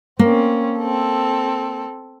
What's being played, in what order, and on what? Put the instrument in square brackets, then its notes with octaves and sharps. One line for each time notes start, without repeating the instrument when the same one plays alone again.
[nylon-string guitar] A#3 [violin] C4 C#4
[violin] C4 A4